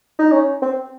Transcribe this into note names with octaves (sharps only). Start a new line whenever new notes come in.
D#4
C#4
C4